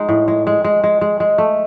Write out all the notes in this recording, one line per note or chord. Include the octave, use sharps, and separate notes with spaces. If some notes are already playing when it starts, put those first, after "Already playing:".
Already playing: G#3 D#4
A2
G#3
G#3
G#3
G#3
G#3
G#3
A3